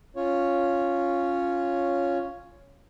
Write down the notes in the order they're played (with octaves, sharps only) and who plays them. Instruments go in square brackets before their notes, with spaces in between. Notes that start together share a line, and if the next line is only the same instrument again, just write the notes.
[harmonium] C#4 F4 C#5